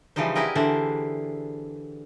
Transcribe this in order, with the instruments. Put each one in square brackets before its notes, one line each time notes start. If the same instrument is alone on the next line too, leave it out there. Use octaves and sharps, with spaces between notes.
[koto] C#3 E3 F3 G3 D#4 C5
B3 E4 G4 G#4 A#4 D#5
D3 E3 D4 C5